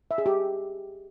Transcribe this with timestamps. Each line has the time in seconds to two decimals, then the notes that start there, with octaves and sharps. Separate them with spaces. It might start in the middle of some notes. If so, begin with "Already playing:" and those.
0.11 E5
0.18 G#4
0.26 G4